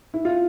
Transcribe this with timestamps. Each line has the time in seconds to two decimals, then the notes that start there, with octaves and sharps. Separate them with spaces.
0.14 E4
0.25 F4